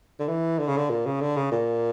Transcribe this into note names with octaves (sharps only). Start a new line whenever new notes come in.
D3
E3
D3
C#3
D3
A#2
C#3
D3
C#3
A#2